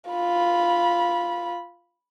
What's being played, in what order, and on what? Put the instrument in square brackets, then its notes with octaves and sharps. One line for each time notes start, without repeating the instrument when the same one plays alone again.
[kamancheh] F4 B5